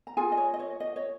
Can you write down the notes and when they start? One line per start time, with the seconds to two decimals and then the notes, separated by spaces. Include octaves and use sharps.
0.07 A#5
0.17 F4 G#4 G#5
0.32 D#5
0.37 C#5
0.54 D#5
0.60 C#5
0.80 D#5
0.96 C#5